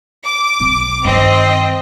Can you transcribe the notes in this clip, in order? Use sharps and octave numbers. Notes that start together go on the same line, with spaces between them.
D6
B1 C4
G2 D#3 C4 D#5